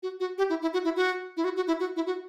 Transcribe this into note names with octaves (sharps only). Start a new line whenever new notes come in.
F#4
F#4
G4
E4
E4
F#4
E4
F#4
E4
F#4
F#4
E4
F#4
E4
F#4